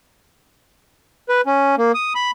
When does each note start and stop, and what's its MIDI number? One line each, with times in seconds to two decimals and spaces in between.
1.29 1.41 71
1.47 1.75 61
1.78 1.92 58
1.94 2.13 87
2.15 2.31 83